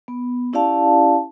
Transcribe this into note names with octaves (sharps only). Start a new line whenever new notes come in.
B3
C#4 E4 G4 D5 F5 A5